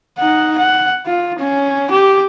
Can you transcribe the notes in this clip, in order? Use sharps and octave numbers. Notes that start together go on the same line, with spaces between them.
D#4 F#5
F#5
F4
C#4
G4